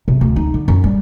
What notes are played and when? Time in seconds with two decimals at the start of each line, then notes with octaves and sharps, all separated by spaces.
0.08 C3
0.21 D2
0.36 D#4
0.54 D3
0.68 F#2
0.84 G3